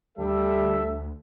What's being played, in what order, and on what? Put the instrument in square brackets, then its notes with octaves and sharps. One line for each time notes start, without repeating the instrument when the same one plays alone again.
[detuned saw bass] D2 [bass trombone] G3 [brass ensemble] A4 E5